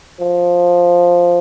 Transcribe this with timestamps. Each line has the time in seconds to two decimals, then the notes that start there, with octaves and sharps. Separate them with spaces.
0.20 F3